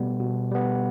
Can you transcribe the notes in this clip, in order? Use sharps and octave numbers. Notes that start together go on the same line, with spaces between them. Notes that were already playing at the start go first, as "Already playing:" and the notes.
Already playing: B2 G3 B3
B2
G3 B3